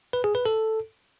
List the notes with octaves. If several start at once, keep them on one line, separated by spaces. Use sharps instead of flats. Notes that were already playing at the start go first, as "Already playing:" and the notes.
B4
G#4
B4
A4